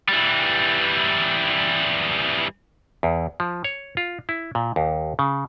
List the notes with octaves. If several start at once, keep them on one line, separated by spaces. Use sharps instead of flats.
E3 G3
E2
F3
C#5
F4
E4
A#2
D#2
C#3